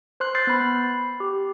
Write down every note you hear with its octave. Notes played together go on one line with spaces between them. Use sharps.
C5 C6 F#6
E6 F#6 G6 A6 C7
B3 B5
G4